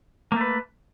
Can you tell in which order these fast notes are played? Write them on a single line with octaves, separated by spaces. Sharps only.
A#3 A3 B4